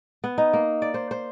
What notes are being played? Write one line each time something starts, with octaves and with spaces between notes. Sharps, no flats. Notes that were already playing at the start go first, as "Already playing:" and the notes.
B3
D#4
A#3
D5
C5
C5